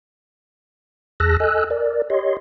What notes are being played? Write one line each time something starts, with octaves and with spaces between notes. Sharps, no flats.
E2 G#4 A5 E6 F#6 A#6
A4 D#5 G#5 E6 F#6
A#4 D5
G4 C#5 D#5 C6